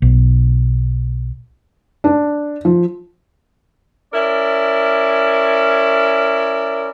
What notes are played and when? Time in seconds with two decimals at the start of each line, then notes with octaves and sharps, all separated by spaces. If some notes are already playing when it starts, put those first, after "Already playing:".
0.02 B1
2.04 D4
2.65 F3
4.13 C#4 E4 A#4 D5